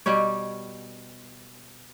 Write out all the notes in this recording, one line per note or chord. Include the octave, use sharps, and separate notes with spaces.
B2 G3 G4 C#5